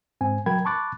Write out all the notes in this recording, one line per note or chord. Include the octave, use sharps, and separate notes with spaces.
G#2 C4 G#5
F#3 A#4 G5 B5 G#6
A5 B5 C#6 D6 F#6 A6